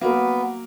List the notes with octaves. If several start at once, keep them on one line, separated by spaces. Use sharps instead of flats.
F#3 A#3 B3